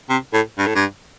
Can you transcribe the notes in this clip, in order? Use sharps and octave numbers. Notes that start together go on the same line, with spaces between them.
C3
A2
G2
A2
G2